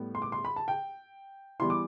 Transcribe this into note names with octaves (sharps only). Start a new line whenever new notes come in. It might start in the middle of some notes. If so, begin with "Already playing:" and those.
Already playing: A2 G3 B3
C6
D6
C6
B5
A5
G5
E3 G3 B3 E4 C6
D6